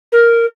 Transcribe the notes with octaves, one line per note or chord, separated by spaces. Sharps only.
A#4